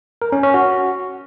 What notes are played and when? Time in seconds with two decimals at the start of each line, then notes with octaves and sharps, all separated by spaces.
0.22 A#4
0.32 C#4
0.43 C#4
0.54 F#4